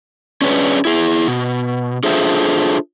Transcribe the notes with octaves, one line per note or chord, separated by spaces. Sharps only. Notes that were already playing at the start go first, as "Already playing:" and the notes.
C#4 D4 G#4 A4 B4 C#5
E4 G#4
B2
D4 F4 G#4 A4 C5 E5